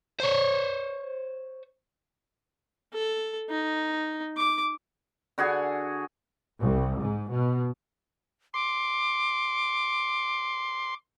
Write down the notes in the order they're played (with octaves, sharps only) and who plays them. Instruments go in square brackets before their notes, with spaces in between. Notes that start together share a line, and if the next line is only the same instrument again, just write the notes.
[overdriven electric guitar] C5 C#5
[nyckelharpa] A4
D#4
D6
[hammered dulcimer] D3 F#4 G#4 G#5
[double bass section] C2
G#2
B2
[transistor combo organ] C6 [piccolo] D6